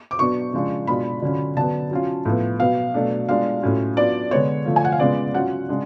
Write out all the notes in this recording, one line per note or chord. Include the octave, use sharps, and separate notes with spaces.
D6
B2 F#3 B3 D4 C#6
C#3 F3 G#3 D4
B2 G#3 D4 F4 B5
D3 F#3 C#4 F4
D3 F#3 B3 A5
F#3 C#4 F4
A2 F3 B3
B2 F#3 B3 F5
B2 F#3 A3 D4
B2 G#3 D4 F4 F5
A2 F#3 C#4 F4
F#3 B3 D4 F4 D5
D3 G#3 B3 C#5
D3 F3 A3 F4
G#5
F#5
F5
C#3 G#3 B3 F4 D5
F#3 C#4 F4 F#5
C#3 G#3 D4